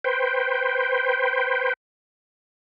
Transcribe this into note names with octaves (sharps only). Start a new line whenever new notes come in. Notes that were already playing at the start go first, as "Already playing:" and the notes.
B4 C5 G5